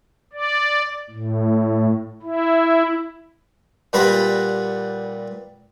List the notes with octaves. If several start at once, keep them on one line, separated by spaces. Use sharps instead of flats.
D5
A2
E4
A#2 G3 B3 F#5 A#5 B5